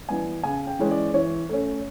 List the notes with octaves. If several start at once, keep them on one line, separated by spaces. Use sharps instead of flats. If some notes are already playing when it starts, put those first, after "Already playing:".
E3 G3 B3 G#5
C#3 G#5
G5
E3 G#3 C#4
D5
E3 C#5
A3 C#4